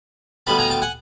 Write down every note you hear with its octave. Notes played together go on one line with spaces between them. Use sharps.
D2 D3 G3 B3 A5 B5
G#5 A#5
G5 A5
F#5 G#5